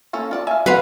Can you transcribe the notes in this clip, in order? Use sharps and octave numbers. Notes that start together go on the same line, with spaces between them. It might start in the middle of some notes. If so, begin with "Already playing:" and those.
A#3 C#4 A4
F4 D5 A5
E5 F5 G#5
F#3 F#4 G#4 B4 C5 F5 F#5